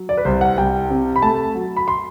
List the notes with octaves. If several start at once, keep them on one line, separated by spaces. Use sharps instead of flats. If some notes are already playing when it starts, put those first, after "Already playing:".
Already playing: F#3
D5
B4
C2 C5
F#5
C2 G5
C3
B5
A3 A5
F#3
B5
C6